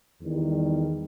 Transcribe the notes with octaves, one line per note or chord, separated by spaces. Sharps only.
E2 D#3 G3